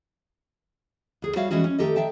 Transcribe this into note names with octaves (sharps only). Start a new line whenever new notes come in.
D2 G#4
G3 F#4 C#5 E5 F5
E3 G3 G#3 C#4 F#4
C#4
D#3 A3 G4 A4 D#5
D#3 E5 G5 A5